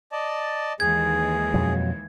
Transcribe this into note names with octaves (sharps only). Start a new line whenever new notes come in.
D5 D#5 A5
D#2 E3 G#3 G#4 G#6
F2 B2 F#3